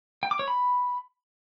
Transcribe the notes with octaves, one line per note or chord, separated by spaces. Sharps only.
G5
D6
C#5
B5